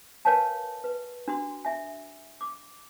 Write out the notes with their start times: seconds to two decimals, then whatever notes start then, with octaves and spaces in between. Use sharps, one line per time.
0.25 A#4 B4 C#5 F5 G#5 A5
0.84 B4
1.28 D4 F#4 C6
1.65 E5 G#5
2.41 D6